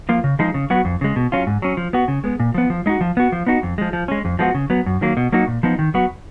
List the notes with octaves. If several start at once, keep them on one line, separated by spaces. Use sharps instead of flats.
F3 A#3 F4
C#3
F3 G#3 D#4
C#3
F#3 B3 F#4
F2
C#3 G#3
B2
F#3 C#4 F4
G#2
F#3 C#4
F3
B3 F#4
C#3
G#3 B3
A#2
F3 B3
F3
G#3 D#4 F#4
F3
B3 F#4
F3
B3 D#4 F#4
F2
F3 G#3
F3
G#3 C#4
F2
F3 G#3 B3 F#4
C#3
F#3 B3
F#2
D#3 F#3 A#3
B2
F#3 A#3 D#4 F#4
A#2
F3 B3 D#4
D#3
F#3 B3 F#4